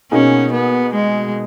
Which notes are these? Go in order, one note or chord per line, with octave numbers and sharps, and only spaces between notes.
B2 A#3 C#4 D#4 G#4
B3
G#3